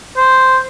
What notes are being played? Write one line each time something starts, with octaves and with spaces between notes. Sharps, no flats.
C5